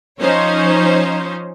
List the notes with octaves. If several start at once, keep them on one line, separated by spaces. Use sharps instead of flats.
F3 C#4 D#4 C5 C#5